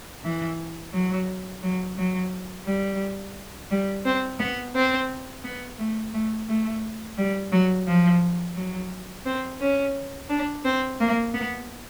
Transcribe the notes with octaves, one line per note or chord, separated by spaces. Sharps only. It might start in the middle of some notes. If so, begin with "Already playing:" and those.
E3
F#3
F#3
F#3
G3
G3
C4
B3
C4
B3
A3
A3
A3
G3
F#3
F3
F#3
C4
C#4
D4
C4
A#3
B3